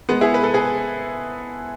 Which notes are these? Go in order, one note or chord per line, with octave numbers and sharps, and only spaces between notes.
G#3 B3
E4 G#4
B4
A4
G#4 B4